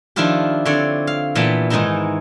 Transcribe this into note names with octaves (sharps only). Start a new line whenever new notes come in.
D#3 F3 D4 E4 F4 G4
D3 C4 C#5 D5
F5
A#2 E3 B3 G5 A5 B5
G#2 D#3 E3 G#3 D#4 E4